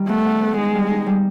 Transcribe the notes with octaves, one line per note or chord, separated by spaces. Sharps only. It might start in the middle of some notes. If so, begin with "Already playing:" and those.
Already playing: D#3 G3
A3 B3
B3
B3
G#3 D#4
G3
D#4
G3